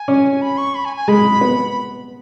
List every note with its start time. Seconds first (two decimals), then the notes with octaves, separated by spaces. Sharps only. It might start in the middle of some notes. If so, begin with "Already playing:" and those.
Already playing: G#5
0.08 C#4
0.42 B5
0.58 C#6
0.75 B5
0.85 G#5
0.96 G#5
1.08 G#3 B5
1.41 B3